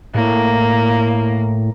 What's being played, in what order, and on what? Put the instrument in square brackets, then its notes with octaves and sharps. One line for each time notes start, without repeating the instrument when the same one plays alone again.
[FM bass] A2 [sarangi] A#3